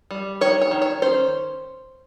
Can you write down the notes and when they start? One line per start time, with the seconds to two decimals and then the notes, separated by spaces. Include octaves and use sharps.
0.11 G3
0.41 D#3 C#5
0.62 C#5
0.71 D#3
0.82 C#5
1.02 C#4 C5